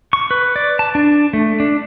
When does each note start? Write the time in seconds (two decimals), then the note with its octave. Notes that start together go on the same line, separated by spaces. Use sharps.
0.13 C#6
0.31 B4
0.56 D5
0.79 A5
0.95 D4
1.33 A3
1.60 D4